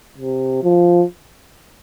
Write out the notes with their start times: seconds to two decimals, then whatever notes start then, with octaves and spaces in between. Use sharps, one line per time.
0.18 C3
0.63 F3